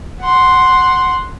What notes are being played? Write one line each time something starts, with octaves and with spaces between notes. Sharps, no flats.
F#5 C6